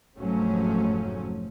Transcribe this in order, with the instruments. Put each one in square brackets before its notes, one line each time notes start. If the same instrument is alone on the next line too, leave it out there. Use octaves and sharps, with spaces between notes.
[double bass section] F1 G#2 F3 F#3 A3 C#4